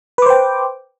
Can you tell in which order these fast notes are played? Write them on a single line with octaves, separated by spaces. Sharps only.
B4 D6 C5 G5